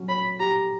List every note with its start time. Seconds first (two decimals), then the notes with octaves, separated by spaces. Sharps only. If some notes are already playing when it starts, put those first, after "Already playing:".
Already playing: F#3 C#4
0.08 C#5 B5
0.40 G4 A#5